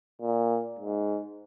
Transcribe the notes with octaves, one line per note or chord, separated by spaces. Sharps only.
A#2
G#2